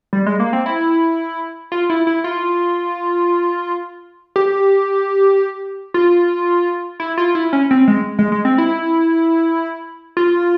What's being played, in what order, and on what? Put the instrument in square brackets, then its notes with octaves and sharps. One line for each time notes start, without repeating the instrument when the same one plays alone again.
[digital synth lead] G3
G#3
A#3
C4
E4
F4
E4
E4
F4
G4
F4
E4
F4
E4
C#4
C4
G#3
G#3
G#3
C4
E4
F4